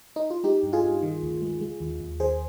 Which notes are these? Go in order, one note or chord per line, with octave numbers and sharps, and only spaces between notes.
D#4
F4
G#3 D#4 G4
G2
F4 G#4
G2
D#3
D2
G#3
G#3
D#2
D#2
D#3 G#4 C5